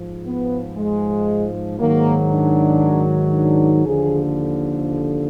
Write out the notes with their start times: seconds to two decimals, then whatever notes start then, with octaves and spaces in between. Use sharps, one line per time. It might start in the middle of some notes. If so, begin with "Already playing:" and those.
Already playing: G#2 F3
0.25 B3
0.77 G#3
1.79 G#2 D#3 F#3 A#3
2.31 D4
3.34 D4
3.85 D#2 D3 F3 G#4